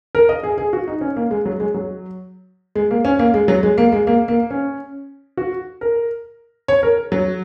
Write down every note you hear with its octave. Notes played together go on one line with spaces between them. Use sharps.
A#4
D#5
G#4
G#4
F#4
D#4
C#4
A#3
G#3
F#3
G#3
F#3
G#3
A#3
C#4
A#3
G#3
F#3
G#3
A#3
G#3
A#3
A#3
C#4
F#4
A#4
C#5
A#4
F#3